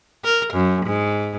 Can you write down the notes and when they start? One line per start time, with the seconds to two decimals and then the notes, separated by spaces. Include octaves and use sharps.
0.24 A#4
0.53 F#2
0.85 G#2